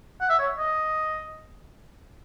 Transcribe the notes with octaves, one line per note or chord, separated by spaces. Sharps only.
F#5
E5
C#5
D#5